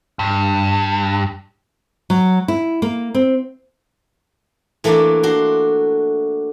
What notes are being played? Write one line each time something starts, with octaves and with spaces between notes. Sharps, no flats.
G2
F#3
E4
A#3
C4
E3 A3 A#3 D4 D5
D4 F#4 C6